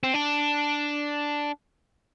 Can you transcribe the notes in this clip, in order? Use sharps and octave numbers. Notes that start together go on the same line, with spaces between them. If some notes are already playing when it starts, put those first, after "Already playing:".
C4
D4